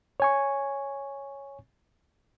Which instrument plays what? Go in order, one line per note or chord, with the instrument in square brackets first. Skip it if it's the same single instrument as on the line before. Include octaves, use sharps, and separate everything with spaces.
[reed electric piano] C#5 G#5 C#6